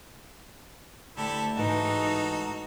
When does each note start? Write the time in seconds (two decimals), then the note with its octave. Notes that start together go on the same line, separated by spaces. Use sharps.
1.17 D2 E4 G4 A4
1.57 G#2 E3 D#4 F#4 A4